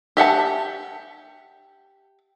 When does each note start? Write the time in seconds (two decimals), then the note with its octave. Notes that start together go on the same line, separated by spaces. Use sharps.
0.17 G4 E5 F#5 A5